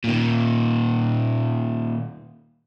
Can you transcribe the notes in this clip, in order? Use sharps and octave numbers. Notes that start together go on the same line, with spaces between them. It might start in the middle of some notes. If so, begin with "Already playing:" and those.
A#2 D#3